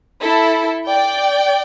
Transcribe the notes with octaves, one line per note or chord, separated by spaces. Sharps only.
E4 A4
D5 G5